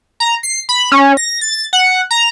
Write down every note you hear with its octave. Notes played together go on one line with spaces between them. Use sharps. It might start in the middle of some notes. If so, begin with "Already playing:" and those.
A#5
C7
B5
C#4
A#6
A6
F#5
A#5